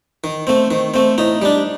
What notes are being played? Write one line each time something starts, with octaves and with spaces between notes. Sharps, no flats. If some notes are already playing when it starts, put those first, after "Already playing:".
D#3
A3 C4
D#3
A3 C4
A2 D#4
G3 D4